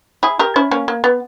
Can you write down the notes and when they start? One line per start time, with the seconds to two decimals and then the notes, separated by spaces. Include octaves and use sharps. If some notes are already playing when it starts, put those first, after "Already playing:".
0.23 E4 G#4
0.39 G4 A#4
0.56 C#4 E4
0.71 A#3 C#4
0.88 A#3
1.04 B3